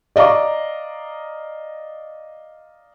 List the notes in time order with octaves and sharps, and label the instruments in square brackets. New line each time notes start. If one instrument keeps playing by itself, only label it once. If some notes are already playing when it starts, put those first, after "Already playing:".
[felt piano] D5 D#5 F5 A#5 D6